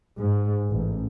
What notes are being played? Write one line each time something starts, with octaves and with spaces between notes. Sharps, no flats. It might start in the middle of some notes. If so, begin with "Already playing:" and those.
G#2
A1